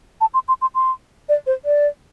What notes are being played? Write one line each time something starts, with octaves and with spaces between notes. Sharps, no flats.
A5
C6
C6
C6
C6
D5
C5
D5